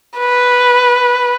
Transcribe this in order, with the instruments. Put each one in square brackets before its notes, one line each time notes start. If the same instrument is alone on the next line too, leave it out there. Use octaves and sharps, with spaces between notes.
[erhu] B4